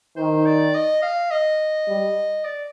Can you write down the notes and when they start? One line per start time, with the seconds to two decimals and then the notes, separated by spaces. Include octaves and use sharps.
0.16 D#3 C5
0.46 D5
0.74 D#5
1.02 F5
1.31 D#5
1.88 G3
2.44 D5